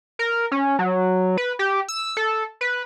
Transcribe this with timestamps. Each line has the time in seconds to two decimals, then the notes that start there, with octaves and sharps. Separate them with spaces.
0.19 A#4
0.52 C#4
0.79 F#3
1.37 B4
1.59 G4
1.88 E6
2.17 A4
2.61 B4